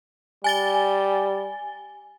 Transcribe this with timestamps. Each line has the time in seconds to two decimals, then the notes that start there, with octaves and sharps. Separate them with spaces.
0.44 G3 G#5 A6 G7